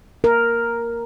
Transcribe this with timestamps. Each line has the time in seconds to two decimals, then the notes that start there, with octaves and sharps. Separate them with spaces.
0.24 A#4